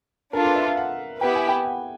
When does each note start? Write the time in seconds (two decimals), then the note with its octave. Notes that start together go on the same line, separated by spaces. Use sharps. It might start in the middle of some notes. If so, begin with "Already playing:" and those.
0.33 D4 F4 A4 A#4
0.45 B4
0.56 E5
0.67 F5
0.77 F#5
1.21 B3 E4 G4 B4 G5
1.35 G#5
1.48 G5
1.65 F#5